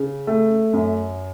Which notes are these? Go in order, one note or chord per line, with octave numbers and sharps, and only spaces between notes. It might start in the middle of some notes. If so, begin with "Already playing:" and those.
Already playing: C#3
A3
F#2